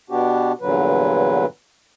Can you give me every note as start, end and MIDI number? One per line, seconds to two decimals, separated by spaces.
0.10 0.52 47
0.10 0.52 59
0.10 0.52 62
0.10 0.52 66
0.10 0.52 67
0.61 1.46 40
0.61 1.46 43
0.61 1.46 46
0.61 1.46 50
0.61 1.46 54
0.61 1.46 71